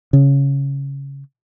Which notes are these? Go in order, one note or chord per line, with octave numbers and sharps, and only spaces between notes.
C#3